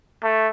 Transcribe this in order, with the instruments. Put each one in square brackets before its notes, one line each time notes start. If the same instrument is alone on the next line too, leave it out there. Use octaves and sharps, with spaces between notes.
[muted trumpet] A3